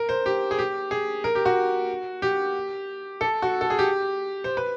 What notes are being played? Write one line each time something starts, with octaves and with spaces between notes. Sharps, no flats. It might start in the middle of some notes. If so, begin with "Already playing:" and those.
Already playing: A#4
C5
G4
G#4
G4
G#4
A#4
G4
F#4
G4
A4
F#4
A4
G#4
G4
C5
B4